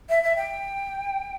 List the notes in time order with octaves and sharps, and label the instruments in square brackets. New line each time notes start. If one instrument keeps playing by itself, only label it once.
[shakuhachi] E5
E5
G5